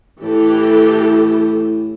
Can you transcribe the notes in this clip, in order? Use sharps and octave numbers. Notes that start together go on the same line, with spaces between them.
A2 E3 G4 A4